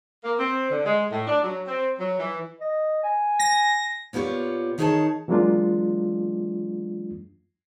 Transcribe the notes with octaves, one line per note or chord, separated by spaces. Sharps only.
A#3
C4
D3
G#3
A2
D4
F#3
C4
F#3
E3
D#5
G#5
A#6
A#2 B3 F4 G4 C#5
D#3 D#4 G#4 C5 C#5 A5
E3 F#3 G#3 A#3 D4 F4